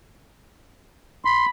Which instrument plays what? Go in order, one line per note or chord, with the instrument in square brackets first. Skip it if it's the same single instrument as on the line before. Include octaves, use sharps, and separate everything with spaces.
[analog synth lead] B5 [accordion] C6